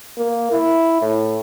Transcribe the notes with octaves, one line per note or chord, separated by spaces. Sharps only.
A#3
E4
A2